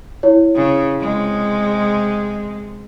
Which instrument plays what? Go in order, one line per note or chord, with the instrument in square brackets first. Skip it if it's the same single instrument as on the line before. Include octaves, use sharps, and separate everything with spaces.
[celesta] E4 C#5
[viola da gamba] C#3
C3 G#3